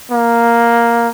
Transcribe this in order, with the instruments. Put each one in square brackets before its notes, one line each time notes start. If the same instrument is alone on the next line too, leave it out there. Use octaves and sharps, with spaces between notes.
[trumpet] A#3